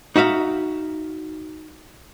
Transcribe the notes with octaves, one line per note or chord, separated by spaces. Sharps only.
D#4 F#4 E5 F5